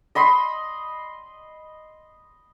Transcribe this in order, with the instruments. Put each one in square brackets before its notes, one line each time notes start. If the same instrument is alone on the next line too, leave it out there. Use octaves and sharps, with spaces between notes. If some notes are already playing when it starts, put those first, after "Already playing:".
[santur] D#5 B5 C6